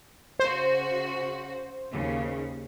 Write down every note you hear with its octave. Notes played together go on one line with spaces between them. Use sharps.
C#3 F#4 C5
D#2 C#3